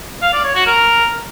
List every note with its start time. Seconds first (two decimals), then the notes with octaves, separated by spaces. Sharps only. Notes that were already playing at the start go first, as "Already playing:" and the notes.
0.22 F5
0.33 D5
0.44 C#5
0.55 F#4
0.66 A#4